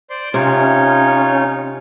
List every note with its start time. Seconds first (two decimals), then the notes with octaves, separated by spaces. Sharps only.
0.10 C5 D5 C6
0.34 C3 C#4 D#4 F4 C#5